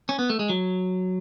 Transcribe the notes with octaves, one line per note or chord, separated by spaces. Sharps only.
C#4
B3
A3
G#3
F#3